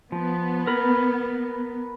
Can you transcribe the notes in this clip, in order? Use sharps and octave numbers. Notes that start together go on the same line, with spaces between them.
F3 B3
A#4 B4 B5